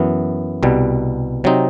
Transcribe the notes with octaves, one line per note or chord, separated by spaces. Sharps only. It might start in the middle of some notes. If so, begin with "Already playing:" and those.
Already playing: F#2 E3 B3
C2 B2 G3
C3 F#3 C4 D#4